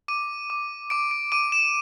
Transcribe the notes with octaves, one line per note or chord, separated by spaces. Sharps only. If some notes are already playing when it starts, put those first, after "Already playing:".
D6 D#7
D6
D6 D7
D7
D6 D#7
E7